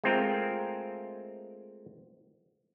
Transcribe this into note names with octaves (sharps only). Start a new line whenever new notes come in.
G#3 A3 C4 F4 A#4